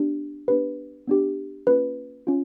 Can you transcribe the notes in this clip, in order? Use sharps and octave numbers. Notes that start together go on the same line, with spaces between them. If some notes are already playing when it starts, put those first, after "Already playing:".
Already playing: B3 D4 G4
B3 D4 G4 B4
B3 D4 G4
A#3 C#4 F4 B4
C#4 F4